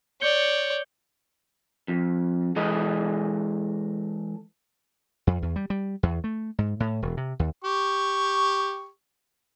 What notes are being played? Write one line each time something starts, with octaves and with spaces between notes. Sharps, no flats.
C#5 D5 G6 C#7 G7
F2
E3 G#3 A4 D#5
F2
E2
G3
G3
E2
A3
G#2
A2
E1
C3
D#2
G4 C#6